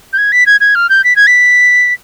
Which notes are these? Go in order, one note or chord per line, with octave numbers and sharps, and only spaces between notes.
G6
G#6
B6
G#6
G#6
F6
G6
B6
G#6
B6